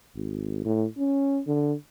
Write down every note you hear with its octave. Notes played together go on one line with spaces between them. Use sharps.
G#1
A2
C#4
D3